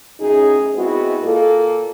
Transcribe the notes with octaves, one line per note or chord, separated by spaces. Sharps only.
F#2 A2 D#4 G#4
G#3 B3 C4 E4 F#4
A#2 A#3 F4 A4